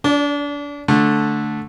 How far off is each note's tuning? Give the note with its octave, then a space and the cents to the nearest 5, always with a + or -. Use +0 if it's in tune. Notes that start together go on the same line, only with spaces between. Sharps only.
D4 -30 D5 +0
D3 +0 A3 -5